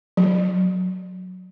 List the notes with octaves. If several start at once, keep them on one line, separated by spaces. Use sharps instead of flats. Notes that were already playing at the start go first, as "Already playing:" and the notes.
F#3